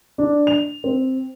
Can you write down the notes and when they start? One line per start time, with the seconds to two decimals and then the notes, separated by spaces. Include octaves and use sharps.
0.18 D4
0.47 F7
0.84 C4